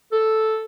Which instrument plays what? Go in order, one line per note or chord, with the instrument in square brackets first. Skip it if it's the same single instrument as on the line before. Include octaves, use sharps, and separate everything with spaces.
[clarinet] A4